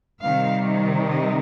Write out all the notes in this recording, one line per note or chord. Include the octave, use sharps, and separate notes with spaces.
C3 D#3 G3 F5
D#5